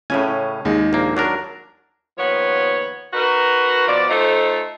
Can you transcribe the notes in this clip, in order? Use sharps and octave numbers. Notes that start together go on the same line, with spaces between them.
A2 C#3 C#4 G#5
D#2 G#3
A#1 A#3
F#3 D4 A#4
D#2 F3 B3 C#5
D#4 F#4 A#4 B4
B2 F3 D5
A3 D#4 F4 A4 C5